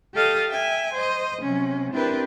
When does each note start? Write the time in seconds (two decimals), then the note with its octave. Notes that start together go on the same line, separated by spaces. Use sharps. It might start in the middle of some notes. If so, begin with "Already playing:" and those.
0.14 G4 A4 D#5 F5 D#6 F6
0.48 E5 G5 G#5
0.93 C5 D#5
1.41 C3 F#3 C#4
1.92 C4 D4 E4 G4 A#4 B4